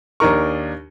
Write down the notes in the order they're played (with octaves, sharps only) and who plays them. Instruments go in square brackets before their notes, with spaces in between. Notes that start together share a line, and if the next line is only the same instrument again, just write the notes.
[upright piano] D#2 D4 D#4 A#4 C#6